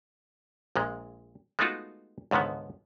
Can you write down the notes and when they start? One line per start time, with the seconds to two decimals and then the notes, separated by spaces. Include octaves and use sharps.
0.76 A#1 A#2 G#3
1.59 G#3 A3 B3 D#4 F4 F#4
2.31 C#2 G#2 D3 D#3 B3